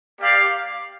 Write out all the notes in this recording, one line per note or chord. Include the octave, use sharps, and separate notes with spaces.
A#3 G4 D5 F5